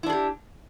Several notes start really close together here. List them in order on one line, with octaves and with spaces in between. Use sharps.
E4 D4 G#4 G4